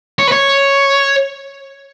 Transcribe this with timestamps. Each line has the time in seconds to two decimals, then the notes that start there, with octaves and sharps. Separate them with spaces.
0.19 C#5
0.28 B4
0.32 C#5